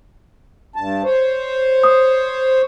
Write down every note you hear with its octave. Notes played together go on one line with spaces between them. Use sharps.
G2 A5
C5 C#5
D#6